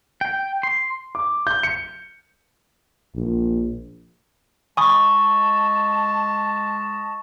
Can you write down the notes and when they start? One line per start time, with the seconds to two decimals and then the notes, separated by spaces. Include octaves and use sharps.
0.21 G5
0.63 C6
1.15 D6
1.47 G6
1.63 C#7
3.15 A#1
4.77 G#3 D#5 G#5 A5 B5 C#6 D#6